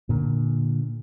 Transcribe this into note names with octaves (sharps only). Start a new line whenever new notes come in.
A#2 D3